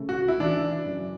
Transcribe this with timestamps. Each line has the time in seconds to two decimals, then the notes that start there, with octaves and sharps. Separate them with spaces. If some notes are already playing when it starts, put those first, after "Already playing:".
Already playing: C#3 A3
0.09 F#4
0.28 E4
0.40 E3 D4
0.86 F#2